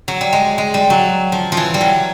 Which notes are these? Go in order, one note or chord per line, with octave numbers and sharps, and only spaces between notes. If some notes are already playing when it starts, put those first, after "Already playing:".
F#3
G3
G#3
G#3
G3
F#3
F3
F3
E3
G3
F#3